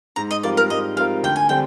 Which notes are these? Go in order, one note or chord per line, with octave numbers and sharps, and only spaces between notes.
G#2 A#5
D#5
G3 C4 F4 A#4 D5
A#4
G#2 D#5
G3 C4 F4 A#4 F5
D2 G5
G#5
D3 G3 C4 G5